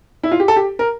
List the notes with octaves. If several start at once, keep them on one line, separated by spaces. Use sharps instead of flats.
E4
F4
G4
A4
G4
A#4